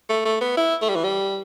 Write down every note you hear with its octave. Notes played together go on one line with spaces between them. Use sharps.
A3
A3
B3
E4
A3
G3
E3
G3